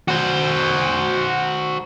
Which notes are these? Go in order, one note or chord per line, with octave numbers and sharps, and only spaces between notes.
F#4 C5